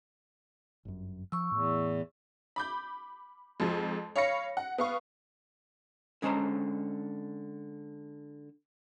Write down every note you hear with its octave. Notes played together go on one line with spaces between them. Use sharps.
G1 F#2
F3 C#6 E6
E2 A2
B5 D6 G6
F2 G#2 F3
C#5 F5 B5 A#6 C#7
F#5
B3 F5 C#6
D3 G#3 C#4 C5 A5 A#5